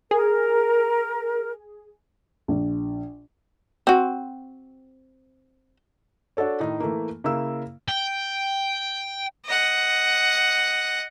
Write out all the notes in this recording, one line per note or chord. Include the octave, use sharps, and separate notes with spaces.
G#4 A#4
A#1
C4 F#4
D4 F#4 A4 C#5
A2 D#3 D#4
E3 A3 A#3
C#3 A#3 E4 E6
G5
D#5 F#5